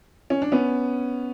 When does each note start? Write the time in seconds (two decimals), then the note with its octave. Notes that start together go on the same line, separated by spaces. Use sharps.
0.30 C#4
0.42 D4
0.52 B3 C#4